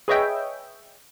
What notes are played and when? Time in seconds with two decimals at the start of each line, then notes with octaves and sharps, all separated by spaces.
0.08 G#4 B4 C#5 D#5 E5 G5